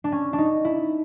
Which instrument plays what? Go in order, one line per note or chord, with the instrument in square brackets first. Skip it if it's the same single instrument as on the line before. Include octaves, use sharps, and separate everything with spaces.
[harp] D4
C#4
D4
D#4
E4